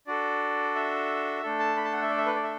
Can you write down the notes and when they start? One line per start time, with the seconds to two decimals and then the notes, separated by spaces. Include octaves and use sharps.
0.07 D4 F#4 A4 D5
0.75 E5
1.43 A3 D4 A4
1.59 A5
1.77 B5
1.84 A5
1.93 F#5
2.02 E5
2.10 D5
2.18 E5
2.26 B4
2.35 D5
2.43 E5